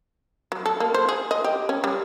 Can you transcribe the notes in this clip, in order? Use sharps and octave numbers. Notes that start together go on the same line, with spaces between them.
F#3
A4
A#3
C5
G#4
D#5
G4
C#4
G3